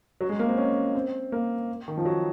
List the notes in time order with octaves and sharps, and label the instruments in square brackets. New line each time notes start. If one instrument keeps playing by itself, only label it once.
[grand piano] F#3
G#3
A#3
C4
C#4
C4
A#3
D#3
F3
F#3